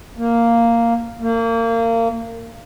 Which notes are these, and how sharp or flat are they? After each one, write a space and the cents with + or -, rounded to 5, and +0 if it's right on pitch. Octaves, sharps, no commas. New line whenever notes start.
A#3 -5
A#3 -30